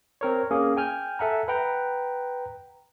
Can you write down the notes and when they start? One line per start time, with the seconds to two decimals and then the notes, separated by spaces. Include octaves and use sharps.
0.21 C4 A#4 C#5
0.51 A#3 C#4 G#4
0.77 G5 G#5 F6 G6
1.19 A4 E5 F#5 G#5 A#5
1.48 B4 F#5 G5 A#5